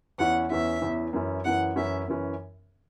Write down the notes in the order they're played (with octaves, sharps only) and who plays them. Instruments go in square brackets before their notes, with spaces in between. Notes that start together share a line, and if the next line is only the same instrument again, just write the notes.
[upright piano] E2 E3 C#4 E4 [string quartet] F#5
[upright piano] E2 E3 C#4 E4 [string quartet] E5
[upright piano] E2 E3 C#4 E4
F#2 E3 C#4 E4
[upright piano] F#2 E3 C#4 E4 [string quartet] F#5
[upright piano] F#2 E3 C#4 E4 [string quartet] E5
[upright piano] F#2 E3 C#4 E4